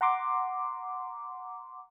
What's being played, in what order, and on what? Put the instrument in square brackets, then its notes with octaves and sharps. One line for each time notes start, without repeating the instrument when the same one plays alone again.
[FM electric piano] F#5 A#5 C6 D6